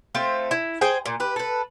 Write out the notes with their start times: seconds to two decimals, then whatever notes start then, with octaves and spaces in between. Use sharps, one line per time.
0.15 A3 C4 F4
0.51 E4
0.81 G#4 C5 G5
1.06 A#2
1.20 G4 B4
1.36 A4 B4